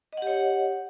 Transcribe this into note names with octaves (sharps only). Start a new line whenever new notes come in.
G4 C#5 D#5 F#5